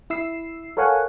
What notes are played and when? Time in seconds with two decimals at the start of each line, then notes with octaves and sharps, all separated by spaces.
0.10 E4 E6 C7
0.77 A4 A#4 C#5 F5 F#5 G#5